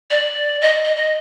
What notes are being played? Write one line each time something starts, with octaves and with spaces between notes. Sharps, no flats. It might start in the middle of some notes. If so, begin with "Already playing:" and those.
D5
D#5
D#5
D#5